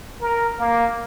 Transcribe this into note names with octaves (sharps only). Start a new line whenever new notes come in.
A#4
A#3